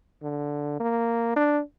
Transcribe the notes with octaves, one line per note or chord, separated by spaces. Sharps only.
D3
A#3
D4